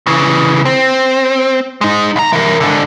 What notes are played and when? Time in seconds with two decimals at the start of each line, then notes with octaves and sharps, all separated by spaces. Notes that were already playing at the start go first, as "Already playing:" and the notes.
0.07 C#3 E3
0.65 C4
1.81 G#3 D#4
2.16 C2 A#5
2.33 E3 A#4
2.60 G#2 D3